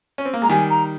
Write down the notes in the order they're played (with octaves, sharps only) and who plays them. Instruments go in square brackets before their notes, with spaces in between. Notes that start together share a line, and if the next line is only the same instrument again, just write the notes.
[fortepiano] C#4
C4
A#3
[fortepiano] G#3 [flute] A#5
[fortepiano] D#3 G3 [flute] G#5
[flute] A#5